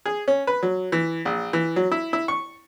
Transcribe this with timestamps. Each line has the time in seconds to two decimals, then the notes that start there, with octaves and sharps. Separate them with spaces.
0.06 G#4
0.28 C#4
0.47 B4
0.63 F#3
0.92 E3
1.25 A#1
1.53 E3
1.76 F#3
1.92 E4
2.13 E4
2.28 C#6